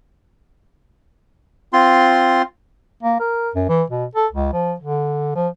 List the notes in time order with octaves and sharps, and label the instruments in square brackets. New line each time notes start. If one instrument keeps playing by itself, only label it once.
[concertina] C4 F4 C6
[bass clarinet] A#3
A#4
F#2
E3
B2
A4
C#2
F3
D3
F3